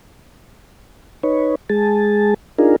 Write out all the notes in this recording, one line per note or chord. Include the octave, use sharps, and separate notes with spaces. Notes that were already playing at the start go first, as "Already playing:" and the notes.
D#4 B4 C#5
G#3 G#4 A5
D4 D#4 F4 G#4 A#4